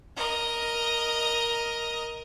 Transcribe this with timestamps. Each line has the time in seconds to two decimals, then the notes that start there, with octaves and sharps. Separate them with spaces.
0.16 A#4 D#5